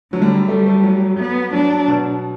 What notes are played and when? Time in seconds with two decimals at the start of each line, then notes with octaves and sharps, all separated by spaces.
0.13 D3 F#3
0.22 G3
0.48 G3 A3
0.66 A3
0.83 F#3
1.19 B3
1.53 F#3 D4
1.88 B2